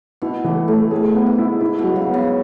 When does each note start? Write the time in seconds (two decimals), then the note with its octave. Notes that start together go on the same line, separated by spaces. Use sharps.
0.22 B2 E4
0.44 A2 E3
0.68 A2 A3
0.91 A2 G#4
1.14 B3
1.27 G#2
1.38 E4
1.61 E4
1.79 B2
1.84 F#3
1.96 C#3
2.07 B3
2.14 C#3